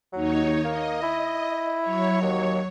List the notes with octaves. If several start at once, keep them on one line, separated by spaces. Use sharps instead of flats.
D#2 F#3 D#4 C#5
A#3 D#5
E4
F#3 C#5
D#2